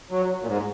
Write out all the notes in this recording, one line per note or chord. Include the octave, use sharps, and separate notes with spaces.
F#3
A#2
G#2